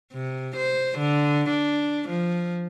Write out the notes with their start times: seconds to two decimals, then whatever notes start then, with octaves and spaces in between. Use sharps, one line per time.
0.13 C3
0.56 C5
0.99 D3
1.50 D4
2.09 F3